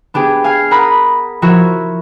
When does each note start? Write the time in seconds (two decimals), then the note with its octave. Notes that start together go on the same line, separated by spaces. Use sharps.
0.14 B3 D4 G4 G#4
0.44 F5 G#5 F6 C7
0.71 A#4 F#5 A#5 B5 D#6
1.42 F3 E4 F#4 A#4 C#5 E5